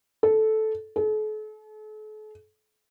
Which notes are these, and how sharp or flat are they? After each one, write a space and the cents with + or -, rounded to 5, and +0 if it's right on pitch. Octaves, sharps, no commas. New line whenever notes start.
A4 -10
A4 -45